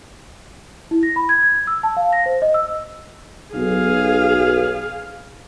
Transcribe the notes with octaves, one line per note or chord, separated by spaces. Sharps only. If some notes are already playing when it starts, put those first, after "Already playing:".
E4
A#6
B5
G#6
G#6
E6
A5
F5
A#6
C5
D#5
E6
B1 G#4 F5